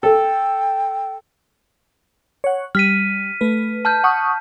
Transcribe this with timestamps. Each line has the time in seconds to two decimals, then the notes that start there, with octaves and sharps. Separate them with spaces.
0.03 A4 G5
2.44 C#5 F#5
2.75 G3 F6 B6 D#7
3.41 A3 B4
3.85 A5 F6 G6
4.04 F#5 C#6 D#6